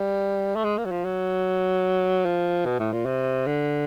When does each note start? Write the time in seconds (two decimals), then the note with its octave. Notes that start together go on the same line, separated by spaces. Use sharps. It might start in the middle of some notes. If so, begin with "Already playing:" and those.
Already playing: G3
0.56 A3
0.64 G#3
0.77 A#3
0.85 F#3
0.91 F3
1.05 F#3
2.25 F3
2.65 B2
2.79 A2
2.92 A#2
3.06 C3
3.46 D3